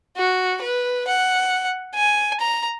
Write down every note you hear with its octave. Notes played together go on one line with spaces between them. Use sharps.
F#4
B4
F#5
G#5
A#5